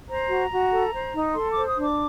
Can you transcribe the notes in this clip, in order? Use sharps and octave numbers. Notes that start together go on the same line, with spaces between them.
C5 A#5
F#4
F#4
A4
C5
D#4
A4 C6
C5 D6
D#6
D4
D6